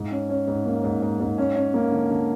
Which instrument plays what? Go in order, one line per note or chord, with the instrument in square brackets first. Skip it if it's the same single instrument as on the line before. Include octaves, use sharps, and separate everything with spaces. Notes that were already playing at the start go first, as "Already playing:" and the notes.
Already playing: [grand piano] G#2
C#4
C#4
G#2
A#3
G#2
G#2
G#2
C#4
C#4
A#3
D3
D3